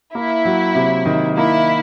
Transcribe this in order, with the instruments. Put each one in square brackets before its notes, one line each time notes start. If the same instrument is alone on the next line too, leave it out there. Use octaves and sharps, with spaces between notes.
[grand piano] A#3 [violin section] E4
[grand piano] F#3
C3
D#3
[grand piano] A#3 [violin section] E4